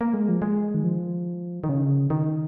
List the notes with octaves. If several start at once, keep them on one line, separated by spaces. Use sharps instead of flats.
A#3
G#3
F3
G#3
D#3
F3
D#3
C#3
D#3